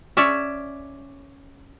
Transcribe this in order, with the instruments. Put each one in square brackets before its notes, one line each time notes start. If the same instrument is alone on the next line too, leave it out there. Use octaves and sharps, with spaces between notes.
[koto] C#4 C#5 D5 E5